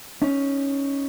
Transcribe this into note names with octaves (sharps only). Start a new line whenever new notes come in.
C#4 D#4